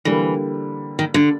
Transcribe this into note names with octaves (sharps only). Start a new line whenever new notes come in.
D3 E3 G3 A#3
D#3
D3